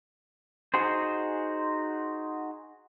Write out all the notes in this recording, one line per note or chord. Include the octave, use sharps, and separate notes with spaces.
D#4 F#4 G#4 C5